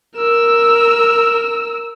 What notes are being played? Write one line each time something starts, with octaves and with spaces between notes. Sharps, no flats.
A#4 E6